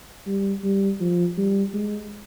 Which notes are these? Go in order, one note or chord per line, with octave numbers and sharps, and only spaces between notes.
G3
G3
F3
G3
G#3